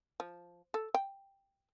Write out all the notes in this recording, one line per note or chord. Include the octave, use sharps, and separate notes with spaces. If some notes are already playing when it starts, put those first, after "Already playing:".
F3
A4
G5